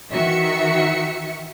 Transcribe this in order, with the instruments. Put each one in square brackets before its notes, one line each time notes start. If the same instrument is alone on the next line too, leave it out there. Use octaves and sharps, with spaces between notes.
[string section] D#3 E3 F#4 E5 C#7